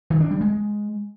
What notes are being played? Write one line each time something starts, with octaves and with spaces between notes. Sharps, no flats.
D#3
D4
G3
G#3